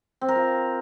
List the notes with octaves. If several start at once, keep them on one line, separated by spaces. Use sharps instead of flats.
C4
A#4
F4